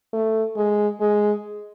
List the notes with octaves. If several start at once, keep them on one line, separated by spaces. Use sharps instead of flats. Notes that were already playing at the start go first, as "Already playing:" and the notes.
A3
G#3
G#3